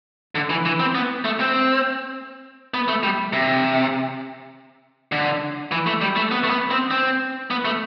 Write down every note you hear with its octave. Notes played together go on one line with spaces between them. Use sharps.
D3
E3
E3
C4
B3
A3
C4
B3
A3
G3
C3
D3
E3
A3
G3
A3
B3
A3
B3
C4
C4
B3
A3